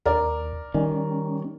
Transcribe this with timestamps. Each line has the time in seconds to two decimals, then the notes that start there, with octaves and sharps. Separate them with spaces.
0.06 D#2 A#4 D5
0.74 D#3 G3 C#4